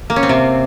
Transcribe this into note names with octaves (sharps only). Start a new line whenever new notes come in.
A#3
C#4
C4
C3